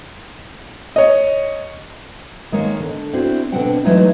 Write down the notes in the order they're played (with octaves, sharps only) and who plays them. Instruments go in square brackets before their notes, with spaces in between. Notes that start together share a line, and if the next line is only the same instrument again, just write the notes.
[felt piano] C#5 D#5
[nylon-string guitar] D#3 G#3 A#3 C#5
D3
C4 D4 E4 F#4
B2 D3 C4 D4 F#5 G5
E3 F#3 G#3 A3 D#4 E4